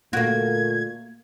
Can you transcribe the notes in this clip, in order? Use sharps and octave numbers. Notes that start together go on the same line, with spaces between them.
A#2 D3 A3 A#3 F#4 G#6